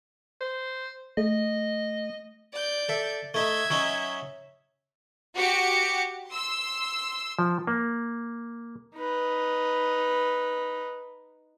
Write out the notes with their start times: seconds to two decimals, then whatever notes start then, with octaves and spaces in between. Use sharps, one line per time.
0.41 C5
1.17 A3 D#5
2.53 D5 G6
2.89 A4 E5
3.34 A3 D#4 E5 G#6
3.70 F#3 C#4 D#4
5.36 F#4 G4 D6 C#7
6.30 C6 E6
7.39 F3
7.67 A#3
8.96 D#4 B4